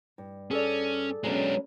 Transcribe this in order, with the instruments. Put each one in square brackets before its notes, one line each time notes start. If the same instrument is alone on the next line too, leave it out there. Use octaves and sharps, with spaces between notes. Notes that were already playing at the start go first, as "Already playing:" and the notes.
[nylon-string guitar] G2
[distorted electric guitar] C#4 [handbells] G#4 A4 D5
[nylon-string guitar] F#3 B3 C#4 [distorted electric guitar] G#3 D4